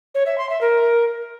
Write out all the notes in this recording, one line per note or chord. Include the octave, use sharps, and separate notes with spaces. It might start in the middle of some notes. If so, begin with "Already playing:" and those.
C#5
E5
C6
E5
A#4